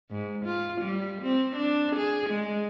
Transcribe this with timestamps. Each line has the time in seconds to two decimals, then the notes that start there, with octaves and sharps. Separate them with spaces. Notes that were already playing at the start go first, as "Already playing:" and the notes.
0.11 G#2
0.46 F4
0.82 G3
1.22 C4
1.56 D4
1.96 G#4
2.30 G#3